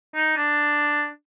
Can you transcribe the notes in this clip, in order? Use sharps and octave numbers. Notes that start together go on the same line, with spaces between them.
D#4
D4